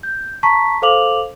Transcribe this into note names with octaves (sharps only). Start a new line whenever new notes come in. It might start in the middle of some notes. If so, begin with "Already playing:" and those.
G6
A5 A#5 C#6 B6
A4 C5 F5 D6 F7 F#7